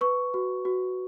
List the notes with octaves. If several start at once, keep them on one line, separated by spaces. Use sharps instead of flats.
B4 C#6
F#4
F#4